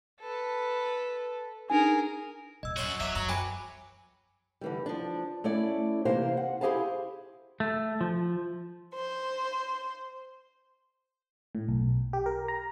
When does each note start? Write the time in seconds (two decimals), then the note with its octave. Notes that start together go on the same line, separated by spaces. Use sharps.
0.20 A4 B4
1.70 D4 D#4 G#4 A#4 G#5
2.63 D#1 D#5 E6
2.77 F#2 F#4 C#5 C6 C#6
3.00 E2 F#3 E5 D6 B6
3.15 F#2 A#5
3.29 B4 G5 G#5 B5 D6
4.61 D3 E3 G3
4.86 F3 D4
5.44 A3 C#4 E4 D5
6.05 C3 E3 A#3 G4 C5 F5
6.37 F#5
6.61 E4 G4 G#4 C5 F5 A5
7.60 A3
8.01 F3
8.94 C5
11.55 A2
11.69 B1
12.13 G4
12.26 A#4
12.48 A#5